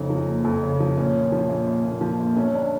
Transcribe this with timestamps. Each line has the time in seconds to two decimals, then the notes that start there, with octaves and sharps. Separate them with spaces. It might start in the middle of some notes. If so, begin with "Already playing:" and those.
Already playing: F#1 F2 C#3 D#4
0.10 F3
0.28 F#1
0.44 F2
0.63 C#3
0.80 F3
0.97 A#1 C#4
1.15 A#2
1.32 F3
1.49 A#1
1.67 A#1
1.84 A#2
2.01 F3
2.19 A#1
2.36 G1 C#4
2.54 D4